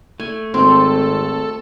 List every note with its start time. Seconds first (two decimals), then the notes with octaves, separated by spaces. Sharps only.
0.20 A3 G#5
0.54 G#1 C4 A4